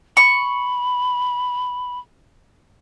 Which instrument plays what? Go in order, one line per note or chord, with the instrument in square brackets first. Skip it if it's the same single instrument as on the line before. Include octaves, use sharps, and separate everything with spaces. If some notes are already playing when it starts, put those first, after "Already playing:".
[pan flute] B5 [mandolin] C#6